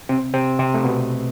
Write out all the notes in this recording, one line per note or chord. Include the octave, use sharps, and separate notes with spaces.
C3 C4
C3 C4
C3 C4
A3
B2 B3